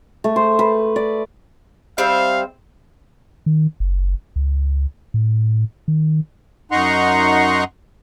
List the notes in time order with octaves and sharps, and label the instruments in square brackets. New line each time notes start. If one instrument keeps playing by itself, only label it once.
[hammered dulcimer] A3
C5
B4
D5
[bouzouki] G3 C4 E5 [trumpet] F5
[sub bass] D#3
F#1
C#2
A2
D#3
[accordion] F#2 D#4 F#5 A#5 C6 C#6